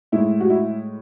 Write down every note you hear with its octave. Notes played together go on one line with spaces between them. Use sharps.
A2 G#3 E4
F#4
E4